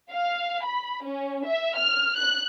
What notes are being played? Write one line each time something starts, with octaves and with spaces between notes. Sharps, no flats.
F5
B5
C#4
E5
F6
F#6